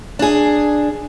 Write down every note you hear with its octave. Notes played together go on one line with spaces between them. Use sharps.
D4 G#4